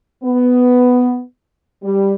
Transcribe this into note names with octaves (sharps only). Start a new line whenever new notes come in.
B3
G3